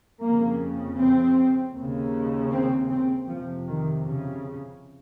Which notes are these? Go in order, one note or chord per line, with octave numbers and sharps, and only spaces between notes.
F2 C#3 A#3
C4
D#2 C#3
C4
C4
F2 C3 F3
D#3
C#3